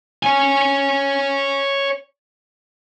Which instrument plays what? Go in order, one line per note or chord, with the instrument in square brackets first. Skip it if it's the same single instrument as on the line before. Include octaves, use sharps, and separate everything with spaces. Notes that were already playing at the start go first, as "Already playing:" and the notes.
[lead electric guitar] C#5 G#5